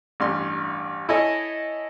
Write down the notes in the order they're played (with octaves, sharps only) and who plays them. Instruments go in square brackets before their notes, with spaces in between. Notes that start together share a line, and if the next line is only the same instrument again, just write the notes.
[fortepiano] A1 G2 C6
E4 A4 C#5 D#5 G#5